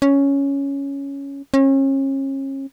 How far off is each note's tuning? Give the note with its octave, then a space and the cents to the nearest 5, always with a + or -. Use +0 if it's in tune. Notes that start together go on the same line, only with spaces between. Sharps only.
C#4 +5
C#4 -35